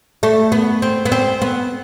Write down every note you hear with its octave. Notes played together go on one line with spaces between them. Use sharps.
A3
B3
C4
B3
C4
B3